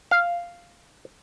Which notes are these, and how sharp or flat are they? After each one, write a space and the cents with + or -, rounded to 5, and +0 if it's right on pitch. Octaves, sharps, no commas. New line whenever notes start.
F5 -5